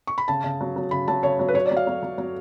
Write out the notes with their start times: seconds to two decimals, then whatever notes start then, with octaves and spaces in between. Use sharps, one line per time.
0.07 C#6
0.18 B5
0.28 C#3 A5
0.44 C#3
0.61 F#3
0.76 F#3
0.91 C#3 B5
1.08 F#3 A5
1.23 C#3 C#5
1.39 F#3
1.48 B4
1.54 F#3 C#5
1.66 D5
1.71 F#3
1.77 F5
1.87 F#3
2.03 F#3
2.18 F#3